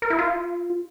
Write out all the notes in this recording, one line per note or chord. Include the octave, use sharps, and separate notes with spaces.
A#4
E4
F4